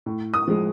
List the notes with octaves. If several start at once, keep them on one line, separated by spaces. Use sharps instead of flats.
A2
D#6
F3 G#3